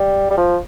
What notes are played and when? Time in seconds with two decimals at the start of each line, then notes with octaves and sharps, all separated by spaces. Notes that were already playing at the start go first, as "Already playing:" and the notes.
Already playing: G3
0.31 G3
0.37 F3